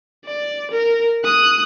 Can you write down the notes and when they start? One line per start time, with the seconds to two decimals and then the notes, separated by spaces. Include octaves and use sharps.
0.25 D5
0.71 A#4
1.24 D#6 F#6